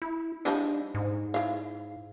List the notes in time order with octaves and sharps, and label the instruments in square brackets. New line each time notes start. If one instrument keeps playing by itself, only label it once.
[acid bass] E4
[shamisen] F3 G3 D#4 [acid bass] D4
[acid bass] G#2
[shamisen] E4 F5